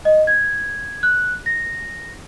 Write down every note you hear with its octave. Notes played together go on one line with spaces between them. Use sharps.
D#5
G#6
F#6
A#6